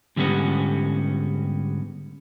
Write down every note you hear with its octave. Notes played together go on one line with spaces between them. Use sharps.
G#2 D3 G3 B3 C#4 F#4